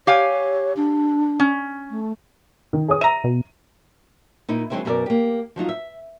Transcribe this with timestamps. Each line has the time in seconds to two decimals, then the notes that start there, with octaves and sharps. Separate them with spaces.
0.07 G4 C#5 F5 G#5
0.77 D4
1.40 C#4
1.90 A3
2.73 D#3
2.88 G#4 C#5 D#6
3.01 E5 A#5 D#7
3.24 B2
4.49 A#2 D#4 E4
4.70 D#3 F#3 G#3 C4 D4 E4
4.85 F#2 B2 F4 A4 A#4 D5
5.06 A#3 G4
5.56 F3 F#3 D#4 F4
5.69 E5